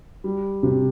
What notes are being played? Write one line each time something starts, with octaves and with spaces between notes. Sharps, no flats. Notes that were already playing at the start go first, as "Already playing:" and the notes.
G3
C3